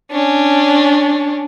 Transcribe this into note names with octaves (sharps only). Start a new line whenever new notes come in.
C#4 D4